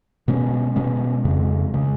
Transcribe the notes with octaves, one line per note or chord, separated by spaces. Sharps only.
B2 G#3 C#4
B2 G#3 C#4
F2 C#3 G#3
C#3 G#3